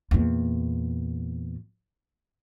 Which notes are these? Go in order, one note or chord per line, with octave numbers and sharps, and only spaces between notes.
E2 A#2